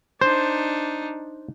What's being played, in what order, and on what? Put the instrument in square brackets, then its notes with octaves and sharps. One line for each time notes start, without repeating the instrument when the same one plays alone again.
[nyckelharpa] D4 D#4 [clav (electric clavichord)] C5